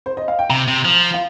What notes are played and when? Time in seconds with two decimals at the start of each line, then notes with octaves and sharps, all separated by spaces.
0.06 C5
0.17 D#5
0.28 F5
0.39 G5
0.50 C3 A#5
0.68 C3
0.85 F3
1.14 F5